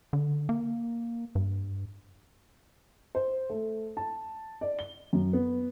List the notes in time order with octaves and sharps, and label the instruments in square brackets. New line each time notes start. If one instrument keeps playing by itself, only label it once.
[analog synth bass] D3
A#3
G2
[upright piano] C5
A3
A5
D5
G7
F#2
B3